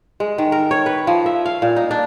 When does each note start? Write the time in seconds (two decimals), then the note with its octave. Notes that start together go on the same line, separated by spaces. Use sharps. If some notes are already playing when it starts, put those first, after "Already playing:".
0.20 G#3
0.38 D#3
0.52 A#4
0.71 C#5
0.86 B4
1.07 F3
1.26 E5
1.46 F5
1.62 A#2
1.76 D#4
1.91 D4